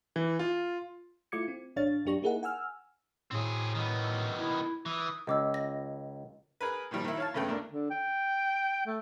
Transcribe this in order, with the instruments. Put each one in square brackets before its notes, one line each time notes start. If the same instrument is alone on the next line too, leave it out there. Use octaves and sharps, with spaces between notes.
[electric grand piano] E3
F4
[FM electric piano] A3 E4 F4 D6 G#6 C#7
C4
A1 D4 C#5 F5 A6
F#2 F#3 D4 G4 C#6 A#6
A#3 D#4 E4 G#4 A#4 F#5
F#5 G#5 E6 F6
[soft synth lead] A2 [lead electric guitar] C4 G#4
[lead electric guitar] D#3 B3
[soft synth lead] E4
[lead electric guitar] E3 [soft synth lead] D#6
[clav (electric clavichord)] C#2 [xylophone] D#5 D6 E6
[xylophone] A#6
[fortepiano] G#4 A#4 B4
A#2 D#3 F3 G3
D#3 E4
C#5 F5 A5
G2 C#3 A3 B3 G5
D2 D4 A#4
[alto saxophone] D3
G5
A3